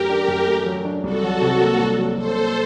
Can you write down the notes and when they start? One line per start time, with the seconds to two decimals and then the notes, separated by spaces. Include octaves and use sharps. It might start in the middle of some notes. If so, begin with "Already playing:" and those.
Already playing: F#2 F#3 A3 G4 A#4
0.09 D4
0.28 F#2
0.47 A3
0.66 F#3
0.85 D4
1.04 C2 F#4 A4
1.23 F#3
1.42 C3
1.60 A#3
1.79 C2
1.98 F#3
2.17 C3 A4 C5
2.36 A#3